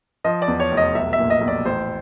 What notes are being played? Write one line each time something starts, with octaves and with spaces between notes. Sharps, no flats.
F3 D#5
D5
E2
C#5
F1
D#5
B1 E5
E5
A#2
D#5
B1
D5
A1 C5